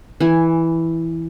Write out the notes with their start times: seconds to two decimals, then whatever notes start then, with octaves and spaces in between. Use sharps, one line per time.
0.20 E3 G#5